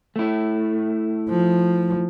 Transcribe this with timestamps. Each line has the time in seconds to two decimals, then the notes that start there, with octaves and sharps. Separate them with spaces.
0.16 A3 E4
1.29 F3